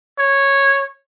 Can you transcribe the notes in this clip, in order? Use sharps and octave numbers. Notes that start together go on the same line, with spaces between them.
C#5